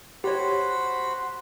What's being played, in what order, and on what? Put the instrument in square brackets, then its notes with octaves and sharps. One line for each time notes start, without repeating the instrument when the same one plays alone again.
[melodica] F#4 C5 B5 [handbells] G4 C#5